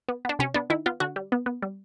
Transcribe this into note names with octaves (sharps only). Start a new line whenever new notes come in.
B3
B3 D4
C3 C#4
B3 D4
D#3 E4
B3 F4
D3 F#4
G3
B3
B3
G3